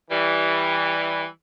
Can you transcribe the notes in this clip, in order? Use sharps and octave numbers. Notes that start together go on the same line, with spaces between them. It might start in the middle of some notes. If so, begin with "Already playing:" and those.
E3 G3